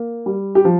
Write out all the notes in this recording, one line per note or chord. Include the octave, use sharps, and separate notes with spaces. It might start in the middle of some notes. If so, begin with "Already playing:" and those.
Already playing: A#3
G3
G4
F3